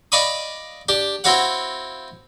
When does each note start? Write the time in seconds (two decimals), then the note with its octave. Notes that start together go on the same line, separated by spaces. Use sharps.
0.12 D5 D#5 F5 B5 C#6 D#6
0.89 D4 G4
1.24 C4 E4 F#4 C#5 F5 F#5